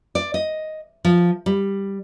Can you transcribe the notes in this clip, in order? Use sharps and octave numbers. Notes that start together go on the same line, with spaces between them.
D5
D#5
F3
G3